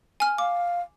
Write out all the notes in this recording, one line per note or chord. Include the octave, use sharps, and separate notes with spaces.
G#5 F6
F5 D6